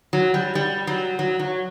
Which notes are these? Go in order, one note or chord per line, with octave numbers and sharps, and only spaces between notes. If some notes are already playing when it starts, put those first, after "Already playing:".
F#3
G3
G3
F#3
F#3
F#3